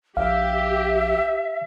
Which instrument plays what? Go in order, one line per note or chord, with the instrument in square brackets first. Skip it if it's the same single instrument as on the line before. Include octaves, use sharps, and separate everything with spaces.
[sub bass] A#1 [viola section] G4 [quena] E5 [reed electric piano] F5